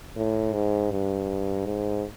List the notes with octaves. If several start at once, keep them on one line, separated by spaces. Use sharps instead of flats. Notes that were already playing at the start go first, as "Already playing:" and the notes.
A2
G#2
G2
G#2